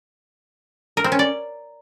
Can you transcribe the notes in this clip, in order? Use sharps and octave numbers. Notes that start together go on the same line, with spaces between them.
A#4
C4
C#4
D5